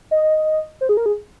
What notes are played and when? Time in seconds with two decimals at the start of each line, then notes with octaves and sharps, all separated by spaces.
0.11 D#5
0.81 C5
0.89 G#4
0.97 A#4
1.06 G#4